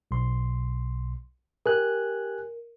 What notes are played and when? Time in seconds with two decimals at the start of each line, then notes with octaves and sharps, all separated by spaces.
0.11 B1 C6
1.66 G4 A#4 G#5 F#6